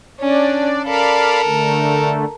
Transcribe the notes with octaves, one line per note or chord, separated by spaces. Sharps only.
C#4 D4 D5
A4 A#4 D5 F5 B5
D3 A3